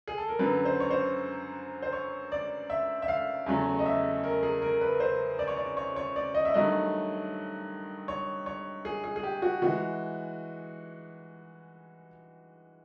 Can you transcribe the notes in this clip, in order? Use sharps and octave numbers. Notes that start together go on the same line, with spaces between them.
G#4
A4
A#4
F#2 D3 F#3 B4
C5
C#5
C5
C5
C#5
D5
E5
E5
F5
E2 C#3 F#3 A3
D#5
E5
A#4
G#4
A#4
B4
C5
D5
C#5
D5
C#5
C#5
D5
D#5
E5
G2 D#3 F#3 A3 D#5
C#5
C#5
G#4
G#4
G#4
G4
F#4
E3 G#3 F#4